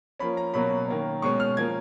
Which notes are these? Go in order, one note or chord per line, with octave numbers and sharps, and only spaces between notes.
F3 A#3 C#4 B5
A#5
B2 F#3 A#3 C#4 B5
D#3 A#3 C#4
B2 G#3 C#4 C#6
F6
F3 A#3 C#4 G#6